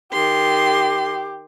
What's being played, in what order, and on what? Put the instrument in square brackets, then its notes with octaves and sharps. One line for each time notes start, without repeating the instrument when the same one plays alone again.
[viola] D#3 C6 [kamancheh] G4